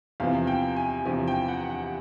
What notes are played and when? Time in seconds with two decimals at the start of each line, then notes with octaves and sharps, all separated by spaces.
0.20 E2 C3 F3 F5
0.47 G5
0.76 G#5
1.05 E2 C3 F3 G#5
1.27 G5
1.48 F#5
1.70 F#5